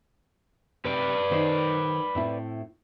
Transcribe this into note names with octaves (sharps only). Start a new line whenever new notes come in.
C3 B4 D5
D#3 C5
A2 C4 E4